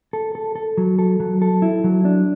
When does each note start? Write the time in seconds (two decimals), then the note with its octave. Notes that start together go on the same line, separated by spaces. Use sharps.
0.13 A4
0.35 A4
0.55 A4
0.78 F#3
0.99 A4
1.20 F#3
1.42 A4
1.62 E4
1.84 F#3
2.05 D4